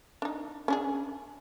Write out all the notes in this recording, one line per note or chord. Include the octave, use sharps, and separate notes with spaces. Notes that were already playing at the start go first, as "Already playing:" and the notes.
D4 D#4
C#4 D4 G#4